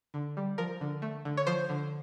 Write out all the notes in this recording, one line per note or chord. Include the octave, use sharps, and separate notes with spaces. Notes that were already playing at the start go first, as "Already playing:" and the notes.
D3
G3
F3 A#4
D3
A3
D3
C#5
F3 C5
D3